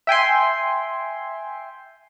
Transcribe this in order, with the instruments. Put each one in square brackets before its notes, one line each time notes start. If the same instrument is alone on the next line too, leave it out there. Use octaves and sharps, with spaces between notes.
[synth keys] E5 G5 G#5 C6